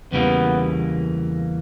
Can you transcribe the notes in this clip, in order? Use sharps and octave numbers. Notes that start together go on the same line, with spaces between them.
E2 C#3 E3 G3 A#3 B3